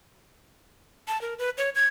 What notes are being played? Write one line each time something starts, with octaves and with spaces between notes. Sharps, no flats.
A5
A#4
B4
C#5
G#6